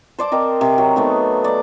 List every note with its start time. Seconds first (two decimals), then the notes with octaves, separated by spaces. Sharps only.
0.19 C5 D5 A5 D6
0.32 C4 A#4 D#5
0.61 C3
0.78 F#3
0.96 A3 B3 D#4
1.44 D5 D#5